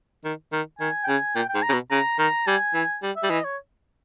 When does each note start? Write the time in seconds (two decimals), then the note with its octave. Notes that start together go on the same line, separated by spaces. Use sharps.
0.24 D#3
0.52 D#3
0.79 D#3 G#5
1.04 G5
1.07 C#3 G#5
1.35 A#2 G5
1.49 G5
1.55 G#2
1.63 A#5
1.69 C#3
1.73 B2
1.91 C#3 A#5
2.18 D#3 A#5
2.47 G3 G#5
2.74 E3
3.03 G3
3.16 E5
3.23 G3
3.30 E3 D#5
3.45 C#5